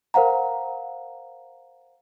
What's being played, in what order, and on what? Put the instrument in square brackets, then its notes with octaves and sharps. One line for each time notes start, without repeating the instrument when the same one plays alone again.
[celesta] A#4 C5 F5 F#5 A#5